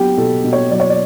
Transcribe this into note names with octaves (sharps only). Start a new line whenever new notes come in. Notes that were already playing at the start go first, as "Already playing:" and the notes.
Already playing: F#3 B3 G4
B2 A4
B2
C#5
F#3 D5
C#5
D5